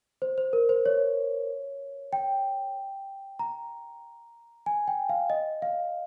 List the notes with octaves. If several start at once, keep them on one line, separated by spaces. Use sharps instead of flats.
C5
C5
A#4
C5
C#5
G5
A#5
G#5
G5
F5
D#5
F5